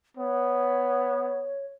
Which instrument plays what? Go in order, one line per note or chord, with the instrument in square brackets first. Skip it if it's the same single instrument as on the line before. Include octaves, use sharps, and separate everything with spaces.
[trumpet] B3 [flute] C#5